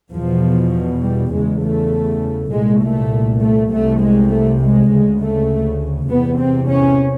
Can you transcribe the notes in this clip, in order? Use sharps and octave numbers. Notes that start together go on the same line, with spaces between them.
E2 B2 F3
G3
E2 C#3 G#3
A3
C2 A#2 G#3
A3
A3
C2 C3 A3
G#3
A3
G#3
D2 C#3
A3
E2 C3 B3
C4
C#4